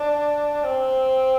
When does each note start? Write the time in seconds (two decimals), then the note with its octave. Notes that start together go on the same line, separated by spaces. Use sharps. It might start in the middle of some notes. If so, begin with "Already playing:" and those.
Already playing: D4
0.64 C4